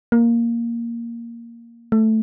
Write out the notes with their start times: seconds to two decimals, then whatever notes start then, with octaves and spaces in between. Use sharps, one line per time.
0.12 A#3
1.92 A3